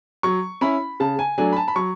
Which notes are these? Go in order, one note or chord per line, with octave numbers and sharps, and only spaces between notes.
F#3 C#6
C#4 E4 B5
C#3 A5
G#5
F#3 A3 D4 G#5
B5
A5
B5
F#3 C#6